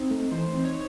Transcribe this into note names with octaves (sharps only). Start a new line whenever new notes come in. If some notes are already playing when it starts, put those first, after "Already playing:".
Already playing: C4 D#4
A3
E3 C5
C4
C#5